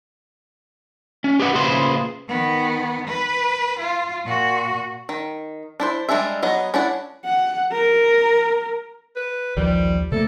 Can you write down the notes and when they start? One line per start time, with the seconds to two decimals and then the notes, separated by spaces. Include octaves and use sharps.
1.24 C#4
1.40 G4 G#4 B4 D#5 F#5
1.54 A#2 C#3 G#4 B4 C5 C6
2.28 D#3 B3
3.08 B4
3.79 F4
4.25 A#2 F#4
5.09 D#3
5.80 D4 E4 C5
6.09 G3 G#3 D4 G#4 E5
6.43 F#3 B3 D#5
6.74 C#4 D4 E4 D5 F#5
7.25 F#5
7.72 A#4
9.16 B4
9.57 A#1 D#2 F3 G3
10.12 C3 A3 A#3 A4